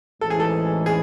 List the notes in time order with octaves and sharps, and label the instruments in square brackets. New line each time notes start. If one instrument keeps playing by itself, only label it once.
[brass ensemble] A1 G#2 E3 [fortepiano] A4
[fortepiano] G#4
A4
G#4